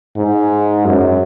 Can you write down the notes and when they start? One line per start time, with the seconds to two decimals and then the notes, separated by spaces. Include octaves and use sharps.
0.17 G#2
0.85 F#2